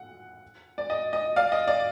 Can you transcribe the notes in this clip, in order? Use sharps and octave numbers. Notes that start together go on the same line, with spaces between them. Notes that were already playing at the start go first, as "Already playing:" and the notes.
Already playing: F#5
D5
D#5
D#5
D5 F5
D#5
D5